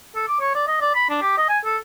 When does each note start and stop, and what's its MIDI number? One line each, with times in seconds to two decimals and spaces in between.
0.16 0.24 69
0.28 0.40 86
0.41 0.53 73
0.55 0.65 74
0.68 0.81 75
0.81 0.91 74
0.95 1.07 83
1.10 1.21 62
1.22 1.33 67
1.37 1.49 75
1.49 1.59 80
1.65 1.77 69